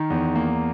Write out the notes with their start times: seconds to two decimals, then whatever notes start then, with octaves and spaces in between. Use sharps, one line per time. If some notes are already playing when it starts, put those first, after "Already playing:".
Already playing: D#3
0.10 E2
0.35 A#3